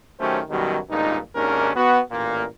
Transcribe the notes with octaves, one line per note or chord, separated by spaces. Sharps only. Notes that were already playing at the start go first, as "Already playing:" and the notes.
D#3 F#3 A3 C#4 G4 C5
F#2 B2 D#3 F#3 G3
G#1 C#2 G2 A#2 D#4
G#1 D#2 G#2 C#4 D4 A#4
B3 F#4
A1 A#2 A#3